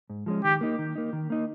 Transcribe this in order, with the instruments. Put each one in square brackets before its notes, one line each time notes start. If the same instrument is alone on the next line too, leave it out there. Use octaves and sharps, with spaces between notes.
[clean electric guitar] G#2
F3 G#3 C#4
[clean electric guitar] D#3 [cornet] G4
[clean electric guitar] A#3 D#4
D#3
A#3 D#4
D#3
A#3 D#4